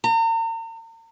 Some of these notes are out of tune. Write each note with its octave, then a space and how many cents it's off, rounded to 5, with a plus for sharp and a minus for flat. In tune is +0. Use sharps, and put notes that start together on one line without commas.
A#5 -40